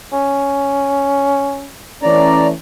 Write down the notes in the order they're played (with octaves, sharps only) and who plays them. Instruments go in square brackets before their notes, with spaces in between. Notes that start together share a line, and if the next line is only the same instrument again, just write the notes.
[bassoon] C#4
[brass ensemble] E3 A3 C#4 [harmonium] D5 A#5